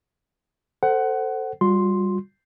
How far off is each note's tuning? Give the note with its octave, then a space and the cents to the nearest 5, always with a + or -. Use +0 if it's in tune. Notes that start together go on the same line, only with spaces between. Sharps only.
A4 +20 C5 +0 F#5 +20
G3 +0 F4 +45 C6 +0